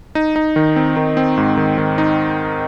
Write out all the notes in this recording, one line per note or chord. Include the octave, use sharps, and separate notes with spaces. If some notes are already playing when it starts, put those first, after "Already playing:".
D#4
D#4
D#3
C4
D#3
C4
G#2
D#3
D#3
D#4